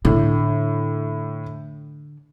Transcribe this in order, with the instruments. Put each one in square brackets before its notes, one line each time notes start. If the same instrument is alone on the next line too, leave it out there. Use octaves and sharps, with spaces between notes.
[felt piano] A2 [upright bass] D3